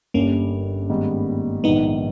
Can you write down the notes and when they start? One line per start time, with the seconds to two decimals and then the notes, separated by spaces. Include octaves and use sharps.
0.14 G1 G2 G3 A#3 C#4
0.90 G#2 D#3 G3 B3
1.64 A#1 G#2 D#3 B3 D#4